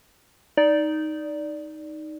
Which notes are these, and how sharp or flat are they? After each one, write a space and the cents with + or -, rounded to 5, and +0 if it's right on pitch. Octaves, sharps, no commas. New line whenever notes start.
D#4 +0 D5 -5